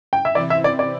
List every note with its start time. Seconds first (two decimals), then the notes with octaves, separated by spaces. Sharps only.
0.13 G5
0.25 E5
0.35 C3 E3 C4 E4 D5
0.50 E5
0.64 D5
0.79 D5